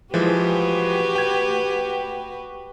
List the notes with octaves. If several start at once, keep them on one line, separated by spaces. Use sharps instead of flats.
E3 F3 G#3 F#4 G4 B4
G5 G#6